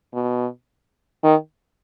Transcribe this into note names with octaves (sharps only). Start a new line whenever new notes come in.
B2
D#3